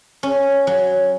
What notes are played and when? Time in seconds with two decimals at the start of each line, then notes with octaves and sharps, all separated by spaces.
0.23 C#4
0.67 F#3